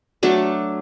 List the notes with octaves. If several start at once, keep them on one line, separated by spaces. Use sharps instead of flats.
F#3 A3 D4